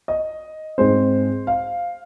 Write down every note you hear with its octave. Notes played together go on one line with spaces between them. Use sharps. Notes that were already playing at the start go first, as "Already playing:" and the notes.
D#5
G#2 G#3 C4 C5
F5